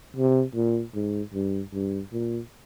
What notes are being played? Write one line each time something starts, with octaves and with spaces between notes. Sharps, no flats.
C3
A#2
G#2
G2
G2
A#2